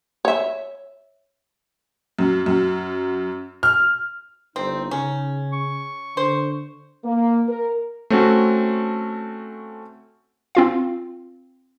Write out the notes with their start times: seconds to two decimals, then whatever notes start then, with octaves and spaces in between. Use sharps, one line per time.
0.25 C#5 E5
2.19 F#2
2.46 F#2
3.63 F6
4.56 G1 C4 D#4
4.91 C#3 C#4
5.53 C#6
6.17 D3 C5
7.04 A#3
7.48 A#4
8.10 A3 C4 C#4 F#4
10.55 C4 F4 F5